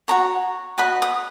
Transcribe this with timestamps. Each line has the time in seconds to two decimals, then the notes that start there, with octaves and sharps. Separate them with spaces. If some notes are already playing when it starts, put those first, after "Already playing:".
0.08 F#4 C#5 A#5
0.78 F#4 B4 D#5 B5
1.02 D#6